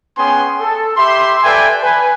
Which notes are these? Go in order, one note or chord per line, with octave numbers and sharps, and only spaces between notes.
B3 C#4 G#4 G5 G#5 C6
A4
G4 E5 B5 C6
A4 B4 D5 E5 G5 G#5
B4 G#5